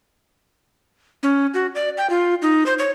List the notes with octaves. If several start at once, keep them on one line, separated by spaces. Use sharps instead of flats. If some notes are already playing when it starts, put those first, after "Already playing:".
C#4
F#4
D5
G5
F4
D#4
C5
C#5